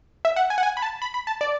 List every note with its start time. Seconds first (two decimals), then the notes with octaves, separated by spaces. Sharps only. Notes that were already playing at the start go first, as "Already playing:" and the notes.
0.25 E5
0.36 F#5
0.50 G#5
0.58 F#5
0.63 G#5
0.77 B5
0.82 A5
1.02 B5
1.14 B5
1.27 A5
1.41 D5